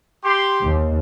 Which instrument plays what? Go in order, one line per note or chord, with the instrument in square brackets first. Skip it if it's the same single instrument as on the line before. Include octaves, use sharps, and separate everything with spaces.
[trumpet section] G4 C6
[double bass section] D#2